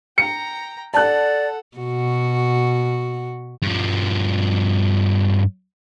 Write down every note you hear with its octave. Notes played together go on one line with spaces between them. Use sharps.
G5 A#5 C#7
A4 D5 F#5 A5 F#6
B2 F#4
G2 F3